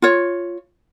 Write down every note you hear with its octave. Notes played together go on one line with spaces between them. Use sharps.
F4 C#5